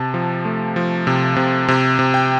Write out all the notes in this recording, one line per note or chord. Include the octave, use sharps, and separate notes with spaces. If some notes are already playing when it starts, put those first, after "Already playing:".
Already playing: C3 A5
F3
A3
F3
C3
C3
C3
C3
G5